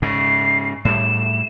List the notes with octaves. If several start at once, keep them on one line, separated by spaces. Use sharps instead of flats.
G#2 C#3 C7
A2 G3 E7